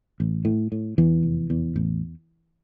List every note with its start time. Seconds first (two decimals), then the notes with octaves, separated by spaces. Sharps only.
0.20 A1
0.45 A2
0.72 A2
0.98 E2 E3
1.23 F1
1.50 E2
1.76 A1